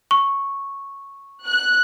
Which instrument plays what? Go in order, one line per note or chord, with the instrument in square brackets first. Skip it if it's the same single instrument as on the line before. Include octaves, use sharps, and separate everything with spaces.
[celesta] C#6
[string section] F#6